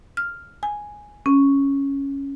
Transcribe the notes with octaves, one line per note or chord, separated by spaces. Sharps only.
F6
G#5
C#4